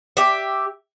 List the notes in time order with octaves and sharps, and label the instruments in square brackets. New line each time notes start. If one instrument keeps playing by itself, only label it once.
[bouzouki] G4 E5